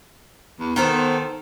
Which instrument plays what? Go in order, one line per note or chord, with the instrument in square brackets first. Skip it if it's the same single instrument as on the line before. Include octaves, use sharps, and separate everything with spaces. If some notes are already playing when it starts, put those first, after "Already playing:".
[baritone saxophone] E2
[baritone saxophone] D#3 [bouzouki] B3 A4 C5